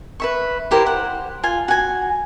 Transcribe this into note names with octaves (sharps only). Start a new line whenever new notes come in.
B4 E5 C#6
E4 G4 A#4 C5
C5 F#5
F4 G#5
F#4 G#5